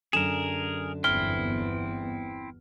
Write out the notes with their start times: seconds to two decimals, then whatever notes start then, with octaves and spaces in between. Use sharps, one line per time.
0.13 F#2 D3 G#4 A#4 E7
1.04 G1 E2 B3 C4 E4 F6 G7